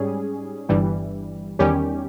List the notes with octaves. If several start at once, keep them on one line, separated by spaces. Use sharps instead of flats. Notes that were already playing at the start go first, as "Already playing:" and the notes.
Already playing: G#2 G3 C#4 G#4
G1 G2 E3 G3
E2 D#3 G3 C#4 G4